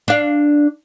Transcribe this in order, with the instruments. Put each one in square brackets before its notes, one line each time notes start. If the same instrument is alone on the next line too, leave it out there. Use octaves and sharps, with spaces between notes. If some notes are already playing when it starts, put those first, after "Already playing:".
[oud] D4 F5